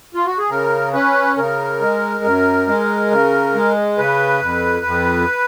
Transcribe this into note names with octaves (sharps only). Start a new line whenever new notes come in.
F4
F#4
G#4
C#3 A#4
C#4 B4
C#3 A#4
G#3
F#2
G#3
C#3
G#3
C#3 B4
F2
F2